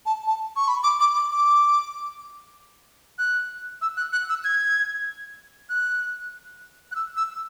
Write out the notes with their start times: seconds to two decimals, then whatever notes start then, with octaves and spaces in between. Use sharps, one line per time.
0.06 A5
0.27 A5
0.56 C#6
0.68 B5
0.84 D6
1.00 D6
1.15 D6
1.31 D6
3.19 F#6
3.82 E6
3.97 F#6
4.13 F#6
4.30 E6
4.44 G#6
5.70 F#6
6.92 F#6
6.95 E6
7.17 E6